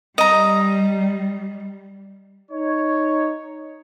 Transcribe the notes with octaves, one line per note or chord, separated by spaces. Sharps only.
G3 D#5 A#5
D#4 C#5